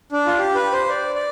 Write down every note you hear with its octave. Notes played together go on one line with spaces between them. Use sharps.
D4
F4
G4
B4
C5
D5
D5